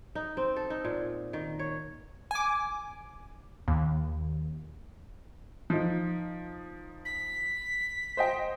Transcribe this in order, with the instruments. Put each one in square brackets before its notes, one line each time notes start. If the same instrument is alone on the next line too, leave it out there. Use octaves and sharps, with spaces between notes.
[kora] D#4
C4
A4
D#4
A#2
D#3
C#5
[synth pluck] G#5 D6
D#2
[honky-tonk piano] F3 D#4
[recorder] B6
[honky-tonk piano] C5 D#5 G5